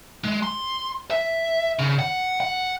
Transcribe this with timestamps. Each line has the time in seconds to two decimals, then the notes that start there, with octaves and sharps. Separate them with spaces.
0.24 G#3
0.43 C6
1.11 E5
1.79 C#3
1.99 F#5
2.40 F#5